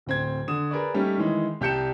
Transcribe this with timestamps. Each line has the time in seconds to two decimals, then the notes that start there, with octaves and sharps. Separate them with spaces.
0.06 D1 C4 G#6
0.48 D3 D#6 E7
0.71 G#4 A#4 B4 D5
0.94 G3 A3 C#4 D#4 G4
1.17 D#3 E3 G#3 D#4
1.61 C2 G4 A5 G6 C#7 E7